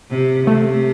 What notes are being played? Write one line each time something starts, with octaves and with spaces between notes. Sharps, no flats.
C3
C3 A3